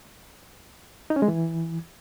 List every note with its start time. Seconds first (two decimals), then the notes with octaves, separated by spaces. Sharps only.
1.10 D#4
1.16 C#4
1.22 G#3
1.28 E3